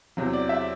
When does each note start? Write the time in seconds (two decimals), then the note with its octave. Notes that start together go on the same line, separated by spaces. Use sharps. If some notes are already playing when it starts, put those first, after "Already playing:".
0.17 E2 C3 F#3
0.33 D5
0.49 E5